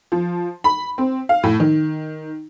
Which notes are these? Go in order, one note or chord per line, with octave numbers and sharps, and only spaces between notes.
F3
B5
C4
F5
A2
D#3